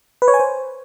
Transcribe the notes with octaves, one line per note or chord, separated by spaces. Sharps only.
B4
C#5
G#5
C5